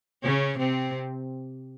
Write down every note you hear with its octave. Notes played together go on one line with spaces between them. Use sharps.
C#3 C#4
C3 C4